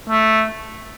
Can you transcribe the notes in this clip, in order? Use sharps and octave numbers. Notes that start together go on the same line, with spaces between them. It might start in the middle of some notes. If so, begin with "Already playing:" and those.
A3